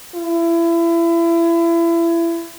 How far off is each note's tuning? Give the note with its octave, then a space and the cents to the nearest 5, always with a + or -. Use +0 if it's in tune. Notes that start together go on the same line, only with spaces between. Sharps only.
E4 +30